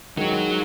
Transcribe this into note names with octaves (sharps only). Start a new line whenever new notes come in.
D#3 F#3 G#3 D#4